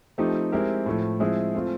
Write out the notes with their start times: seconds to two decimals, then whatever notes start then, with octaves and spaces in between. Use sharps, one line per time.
0.18 F3 A3 C4 D#4 G4
0.52 G#3 C4 E4 G4 A#4
0.86 A2 F3 A3
1.20 F3 G#3 C4 E4 G#4
1.55 A3 C4 F4